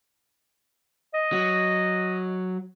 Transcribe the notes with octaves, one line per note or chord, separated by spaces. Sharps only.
D#5
F#3